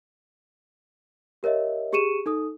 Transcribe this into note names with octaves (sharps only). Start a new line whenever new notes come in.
G4 A#4 C#5 D#5 E5
G4 G#4 C#6 C#7 D#7 E7
D#4 A4 D#6